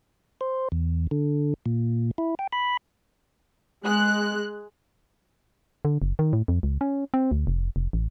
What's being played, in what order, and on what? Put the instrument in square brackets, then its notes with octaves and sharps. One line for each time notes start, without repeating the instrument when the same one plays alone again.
[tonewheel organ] C5
E2
D3
A#2
E4
G5
B5
[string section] G#3 F#6
[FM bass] D3
F#1
D#3
A2
F2
C#2
C#4
C4
D2
F1
F1
A1